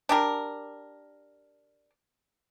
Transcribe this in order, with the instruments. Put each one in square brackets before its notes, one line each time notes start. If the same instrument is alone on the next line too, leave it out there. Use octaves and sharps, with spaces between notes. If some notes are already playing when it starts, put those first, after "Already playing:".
[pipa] D4 G4 A#4